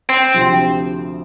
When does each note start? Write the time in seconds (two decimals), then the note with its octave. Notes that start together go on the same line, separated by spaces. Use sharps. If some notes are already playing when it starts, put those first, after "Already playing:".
0.09 C4
0.34 D2 C3 F3